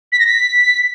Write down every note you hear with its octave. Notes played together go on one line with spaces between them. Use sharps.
B6
A#6
B6